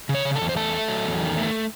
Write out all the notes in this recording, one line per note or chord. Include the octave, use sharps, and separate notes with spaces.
C#3
C#5
C#3
A4
E2
C5
A3 A4
A3
F#3
E2
D#3
A3